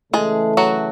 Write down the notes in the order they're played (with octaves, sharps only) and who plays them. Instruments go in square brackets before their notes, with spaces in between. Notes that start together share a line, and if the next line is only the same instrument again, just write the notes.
[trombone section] C#3 E3 A3 [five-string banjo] G#3 G#4
[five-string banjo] F#3 F#4